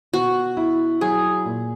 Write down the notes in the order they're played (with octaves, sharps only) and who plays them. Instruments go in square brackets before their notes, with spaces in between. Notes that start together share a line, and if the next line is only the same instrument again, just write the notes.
[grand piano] B2 [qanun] F#4
[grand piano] E4
[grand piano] F#3 [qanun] G#4
[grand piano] A#2